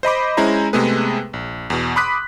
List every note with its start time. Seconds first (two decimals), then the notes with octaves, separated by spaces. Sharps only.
0.03 C5 D#5 B5 D6
0.37 G#3 C#4 E4 C5 A#5
0.73 C3 G#3 A3 B3 G#4 B4
1.33 A#1
1.70 E2 B2
1.96 B5 C6 D6 D#6 F#6 B6